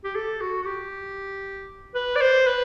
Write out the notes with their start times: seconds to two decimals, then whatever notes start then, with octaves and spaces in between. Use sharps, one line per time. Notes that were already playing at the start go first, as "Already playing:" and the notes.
0.04 G4
0.15 A4
0.41 F#4
0.62 F#4
0.66 G4
1.95 B4
2.16 D5
2.21 C5
2.47 B4